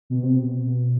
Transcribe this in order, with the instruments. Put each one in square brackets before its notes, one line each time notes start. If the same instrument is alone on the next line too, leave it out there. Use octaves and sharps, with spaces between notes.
[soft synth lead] B2
C3
B2